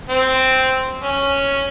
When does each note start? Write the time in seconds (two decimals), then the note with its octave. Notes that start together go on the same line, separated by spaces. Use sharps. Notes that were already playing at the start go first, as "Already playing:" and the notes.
0.09 C4
1.03 C#4